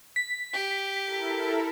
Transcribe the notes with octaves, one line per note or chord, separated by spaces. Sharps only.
B6
G4
E4 A4 A#4